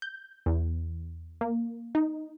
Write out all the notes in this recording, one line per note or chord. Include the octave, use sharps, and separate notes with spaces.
G6
E2
A#3
D#4